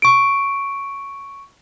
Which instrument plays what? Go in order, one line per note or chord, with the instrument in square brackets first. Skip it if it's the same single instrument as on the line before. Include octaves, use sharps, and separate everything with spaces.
[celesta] C#6 D7